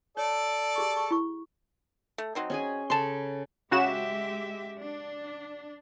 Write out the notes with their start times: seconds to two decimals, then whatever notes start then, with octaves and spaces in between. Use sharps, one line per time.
0.17 A4 C#5 D5
0.76 G4 G#4 C#6
0.97 C#6
1.11 E4 C#6
2.18 A3
2.35 F#3 C4 D#4
2.50 C#4 G#4 G#5
2.90 C#3 A4 A5 C6
3.72 C#3 G#3 F#4 G4 E5 E7
4.80 D4